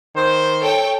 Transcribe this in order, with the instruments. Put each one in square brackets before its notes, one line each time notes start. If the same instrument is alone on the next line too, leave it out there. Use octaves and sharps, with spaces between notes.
[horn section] D#3 C5
[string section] A4 C#5 G5